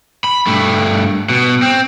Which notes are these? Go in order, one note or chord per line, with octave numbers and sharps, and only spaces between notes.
B5
G2 A3
B2
C4